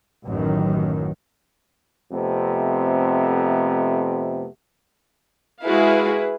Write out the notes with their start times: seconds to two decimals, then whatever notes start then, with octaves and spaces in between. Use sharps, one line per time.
0.24 A1 F#2 D#3
2.11 F2 C3 A3 B3
5.64 G#3 E4 F#4 G#4 B4 F5